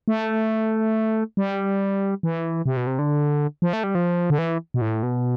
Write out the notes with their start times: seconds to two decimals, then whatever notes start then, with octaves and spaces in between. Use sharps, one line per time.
0.08 A3
1.37 G3
2.23 E3
2.66 C3
2.77 B2
2.87 C3
2.99 D3
3.62 F3
3.73 A3
3.84 G3
3.95 F3
4.30 D3
4.38 E3
4.74 B2
4.81 A2
5.03 B2